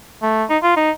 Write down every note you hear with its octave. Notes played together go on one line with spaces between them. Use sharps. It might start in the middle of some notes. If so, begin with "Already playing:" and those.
A3
D#4
F4
D#4